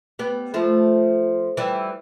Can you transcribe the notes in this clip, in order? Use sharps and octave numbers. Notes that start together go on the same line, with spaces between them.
G3 B3
F3 A3
E3 G3